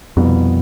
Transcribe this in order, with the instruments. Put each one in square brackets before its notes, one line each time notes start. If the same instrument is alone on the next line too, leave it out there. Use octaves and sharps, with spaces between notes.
[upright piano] C2 B2 B3 [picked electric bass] F2